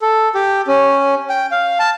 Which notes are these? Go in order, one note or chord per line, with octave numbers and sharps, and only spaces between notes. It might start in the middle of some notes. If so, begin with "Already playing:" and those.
A4
G4
C#4
G5
F5
A5